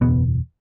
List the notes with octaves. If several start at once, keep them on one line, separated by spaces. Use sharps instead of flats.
F#1 E2 B2 B3